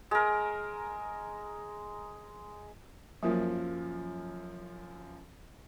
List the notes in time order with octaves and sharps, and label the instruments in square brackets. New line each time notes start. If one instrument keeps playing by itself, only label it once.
[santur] G#3 A#4
[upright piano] F#2 F3 [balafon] F#3 A#3 A#4